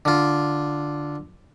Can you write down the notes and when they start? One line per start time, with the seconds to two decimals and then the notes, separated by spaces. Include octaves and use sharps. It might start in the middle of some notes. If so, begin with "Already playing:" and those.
0.05 D3 F4